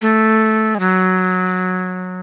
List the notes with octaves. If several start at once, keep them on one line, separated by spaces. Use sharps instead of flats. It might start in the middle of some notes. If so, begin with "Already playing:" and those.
A3
G#3
F#3